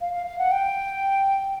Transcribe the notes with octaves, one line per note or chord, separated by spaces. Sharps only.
F5
F5
F5
F#5
G5